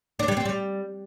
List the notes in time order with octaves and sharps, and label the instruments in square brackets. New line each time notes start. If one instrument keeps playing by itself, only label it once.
[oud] D4
G3
C4
G3